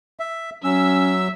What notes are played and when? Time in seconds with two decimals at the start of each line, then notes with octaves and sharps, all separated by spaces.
0.20 E5
0.64 F#3 C#4 E5 E6